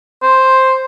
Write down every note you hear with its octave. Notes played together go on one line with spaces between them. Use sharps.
C5